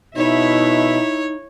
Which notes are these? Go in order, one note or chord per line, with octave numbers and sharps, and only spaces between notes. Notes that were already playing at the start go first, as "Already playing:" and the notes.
B2 D#4 E4 C#5 E5